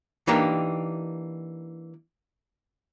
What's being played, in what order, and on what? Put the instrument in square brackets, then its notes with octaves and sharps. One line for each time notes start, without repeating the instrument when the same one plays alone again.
[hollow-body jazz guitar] E3 A#3 D4 D#4 G4 A#4